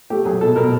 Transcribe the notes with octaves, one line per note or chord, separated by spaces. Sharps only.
A3 G4
F#3 G#4
B2 A4
B2 A#4